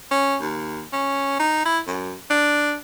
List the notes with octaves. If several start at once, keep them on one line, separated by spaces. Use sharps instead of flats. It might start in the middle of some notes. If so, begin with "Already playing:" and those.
C#4
D#2
C#4
D#4
E4
F#2
D4